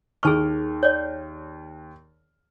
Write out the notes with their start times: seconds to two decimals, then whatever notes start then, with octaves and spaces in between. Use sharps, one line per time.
0.23 D#2 G#4 A5 C#6 F6
0.83 C#5 D5